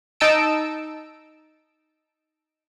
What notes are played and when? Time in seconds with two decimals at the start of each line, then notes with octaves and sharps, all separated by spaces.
0.20 D#4 A5 E6 D7